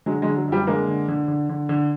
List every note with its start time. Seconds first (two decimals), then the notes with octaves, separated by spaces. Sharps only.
0.06 D3 F#3 G#3
0.22 F#3 G#3
0.27 D3
0.37 F#3
0.48 F#2 F3 G3
0.67 D3 G#3 A#3
0.88 D3
1.08 D3
1.28 D3
1.49 D3
1.69 D3